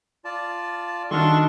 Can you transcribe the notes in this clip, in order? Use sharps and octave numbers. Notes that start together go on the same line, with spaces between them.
F4 D5 A5
D#3 D4 F#4 A4 D#5 C6 C#6 F6